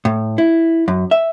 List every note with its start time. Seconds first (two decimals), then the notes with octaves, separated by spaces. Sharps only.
0.05 A2
0.38 E4
0.88 F#2
1.11 E5